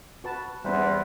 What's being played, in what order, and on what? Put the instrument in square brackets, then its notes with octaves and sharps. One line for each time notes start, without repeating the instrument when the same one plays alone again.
[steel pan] F#4 B4 A5
[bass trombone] E2 [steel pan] G3 B3 C#4 [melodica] B4 C5